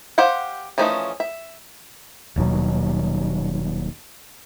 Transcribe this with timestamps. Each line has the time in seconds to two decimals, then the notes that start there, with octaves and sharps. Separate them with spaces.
0.18 G4 C5 F5 F#5
0.78 E3 F3 A3 C#4 D#4
1.20 E5
2.36 D#1 D#2 B2 F#3